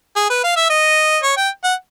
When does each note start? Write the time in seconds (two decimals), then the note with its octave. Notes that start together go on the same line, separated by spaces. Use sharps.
0.16 G#4
0.30 B4
0.44 F5
0.57 E5
0.70 D#5
1.23 C#5
1.37 G5
1.64 F#5